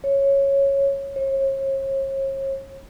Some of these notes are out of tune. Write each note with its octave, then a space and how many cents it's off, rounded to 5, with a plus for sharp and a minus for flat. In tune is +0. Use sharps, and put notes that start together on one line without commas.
C#5 -5
C#5 -40